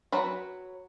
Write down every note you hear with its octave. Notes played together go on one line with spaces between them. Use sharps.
F#3 B4 B5